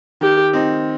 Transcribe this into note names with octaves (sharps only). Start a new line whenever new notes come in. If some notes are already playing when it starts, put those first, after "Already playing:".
D#3 G4
C4 D#4